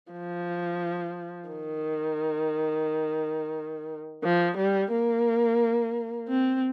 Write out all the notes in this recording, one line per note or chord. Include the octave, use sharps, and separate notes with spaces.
F3
D#3
F3
G3
A#3
C4